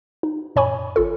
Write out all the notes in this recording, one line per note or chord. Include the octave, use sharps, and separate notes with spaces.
D#4
F#2 A#2 C#5 G#5 B5 C#6
G#1 F4 A4